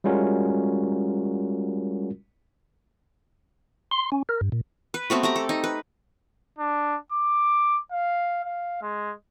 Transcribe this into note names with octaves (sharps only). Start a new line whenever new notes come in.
G3 G#3 C#4 F4 F#4 A#4
C6
C#4
A#4
G2
A#2
B4
A3 B3 C4 F#4
A3 G4 A#5
A4
D#4
B4
D4
D6
F5
F5
G#3